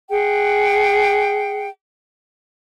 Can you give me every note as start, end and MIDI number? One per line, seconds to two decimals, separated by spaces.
0.10 1.68 68
0.10 1.68 78
0.10 1.68 79